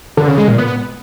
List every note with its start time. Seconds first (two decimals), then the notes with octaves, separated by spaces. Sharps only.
0.17 D3
0.28 C#3
0.38 G#3
0.48 A#2
0.58 B3